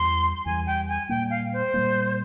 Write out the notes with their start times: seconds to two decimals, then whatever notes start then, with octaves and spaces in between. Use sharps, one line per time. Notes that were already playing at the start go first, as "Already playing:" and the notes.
Already playing: E2 E3 G3 C6
0.46 E2 E3 G3 G#5
0.66 G5
0.89 G#5
1.09 A#2 G3 A#3 G5
1.30 F5
1.53 C5
1.74 A#2 G3 A#3